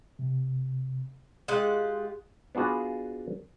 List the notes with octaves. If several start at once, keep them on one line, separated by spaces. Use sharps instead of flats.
C3
G#3 F4 G4 F#5
B3 D4 F4 F#4 G#4